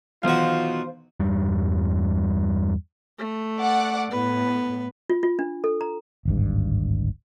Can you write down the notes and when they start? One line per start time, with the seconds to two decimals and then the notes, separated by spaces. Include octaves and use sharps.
0.23 B1 D#3 E3 B3 F4 F#4 C5 F5
1.20 E2 G2 G3
3.18 A3
3.59 D5 F#5 D6
4.11 A2 B3 B4
5.10 F4
5.23 F4
5.39 D4
5.64 A4
5.81 A#5
6.25 D1 G#1 G2